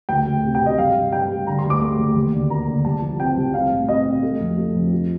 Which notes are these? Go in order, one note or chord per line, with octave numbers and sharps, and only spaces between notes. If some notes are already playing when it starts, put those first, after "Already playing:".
D2 G5
D2
C3
G5
C3
D#5
G2 F5
G2
G2 G5
G3
D3 A#5
C6
D2
D6
A3 D6
D2
D#2
D3
A#3 A#5
D3
C2 A5
F3
C4 G5
C2
C4 F5
A2
C4 D#5
C4
A3
F2
A3
F2
F3